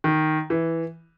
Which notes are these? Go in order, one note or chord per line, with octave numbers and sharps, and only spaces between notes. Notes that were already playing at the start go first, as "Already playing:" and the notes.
D#3
E3